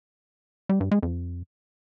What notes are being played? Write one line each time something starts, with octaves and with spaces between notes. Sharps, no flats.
G3
G2
G#3
F2